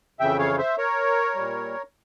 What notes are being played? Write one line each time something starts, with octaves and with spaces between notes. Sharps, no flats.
F2 C#3 E3 E5 G5
C#5 F5
C5 E5
A#4 C#5
A#2 G3